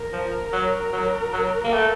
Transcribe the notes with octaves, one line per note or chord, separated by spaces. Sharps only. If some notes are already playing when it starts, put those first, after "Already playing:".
Already playing: A#4
F3
F#3
F#3
F#3
A#3
A3